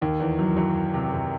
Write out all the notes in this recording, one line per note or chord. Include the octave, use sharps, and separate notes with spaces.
D#2 D#3
E2 E3
F#2 F#3
F#2 F#3
C3
C3